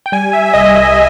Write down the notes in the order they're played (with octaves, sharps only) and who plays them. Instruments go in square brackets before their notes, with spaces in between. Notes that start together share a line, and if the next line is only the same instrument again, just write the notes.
[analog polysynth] G5
G3 G#5
E5
E5
C2 D#5